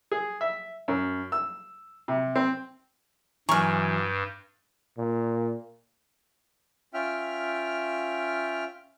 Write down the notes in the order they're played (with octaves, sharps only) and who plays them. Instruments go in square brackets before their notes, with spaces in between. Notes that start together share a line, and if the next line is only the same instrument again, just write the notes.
[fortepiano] G#4
E5
F#2
E6
C3
C4
[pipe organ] G2 [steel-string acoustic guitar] E3 F#3 [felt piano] G#5 F6 [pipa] A#5 C#6
[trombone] A#2
[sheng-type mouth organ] C#4 F4 E5 G5 F6